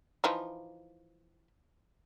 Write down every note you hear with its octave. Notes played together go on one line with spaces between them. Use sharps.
E3 F3 D#4